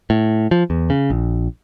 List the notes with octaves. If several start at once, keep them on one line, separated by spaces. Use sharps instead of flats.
A2
F3
E2
C#3
A#1